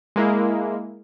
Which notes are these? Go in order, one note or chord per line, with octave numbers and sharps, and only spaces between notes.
G#3 A#3 E4